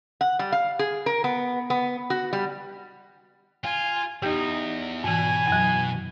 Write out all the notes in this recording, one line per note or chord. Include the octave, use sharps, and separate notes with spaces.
F#5
G3
F5
G#4
A#4
B3
B3
F#4
G3
F4 G#5
E2 D#4 G4 G5 G6
G#2 B2 E3 G#5
F#2 F#3